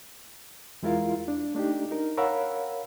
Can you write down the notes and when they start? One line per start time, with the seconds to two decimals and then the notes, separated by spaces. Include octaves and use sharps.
0.83 E2 G#3 E4 F4 A#4 F5
1.28 D4
1.55 A3 D4 D#4 G4
1.91 D#4 A#4
2.17 A#4 C#5 F5 F#5 B5 E6